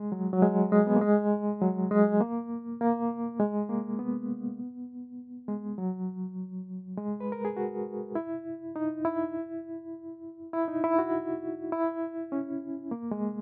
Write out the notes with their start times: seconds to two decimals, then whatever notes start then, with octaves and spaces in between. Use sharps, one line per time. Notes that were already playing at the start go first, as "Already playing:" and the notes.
Already playing: G#3
0.12 F#3
0.33 F#3
0.42 G#3
0.72 G#3
0.87 B3
0.96 A#3
1.02 G#3
1.62 F#3
1.91 G#3
2.20 A#3
2.81 A#3
3.40 G#3
3.69 A#3
3.99 B3
5.48 G#3
5.78 F#3
6.97 G#3
7.20 B4
7.32 A#4
7.45 G#4
7.57 F#4
8.15 E4
8.76 D#4
9.05 E4
10.53 E4
10.68 D#4
10.84 E4
10.99 F#4
11.72 E4
12.32 C#4
12.91 A#3
13.11 G#3